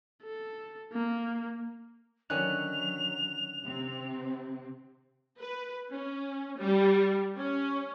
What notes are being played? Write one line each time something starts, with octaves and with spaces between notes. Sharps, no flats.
A4
A#3
D3 D#3 F#3 C#4 F#6 F7
C3 C4
B4
C#4
G3
C#4